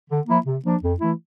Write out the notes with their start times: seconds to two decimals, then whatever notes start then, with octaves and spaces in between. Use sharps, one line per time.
0.10 D3
0.28 F3 A#3 E4
0.46 C3
0.64 F3 A#3 D4
0.83 F2
1.00 E3 A3 E4